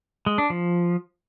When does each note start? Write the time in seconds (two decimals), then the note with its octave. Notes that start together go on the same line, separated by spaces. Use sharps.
0.26 G#3
0.38 D4
0.50 F3